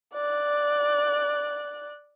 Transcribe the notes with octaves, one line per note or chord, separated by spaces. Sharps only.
D5 F#6